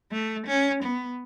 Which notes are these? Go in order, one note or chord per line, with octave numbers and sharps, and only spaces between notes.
A3
C#4
B3